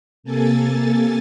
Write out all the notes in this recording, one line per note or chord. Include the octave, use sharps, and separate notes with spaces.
C3 A#3 A4 G#5 A6